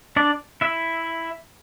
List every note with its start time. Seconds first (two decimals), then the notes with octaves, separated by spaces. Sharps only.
0.16 D4 D5
0.61 E4 E5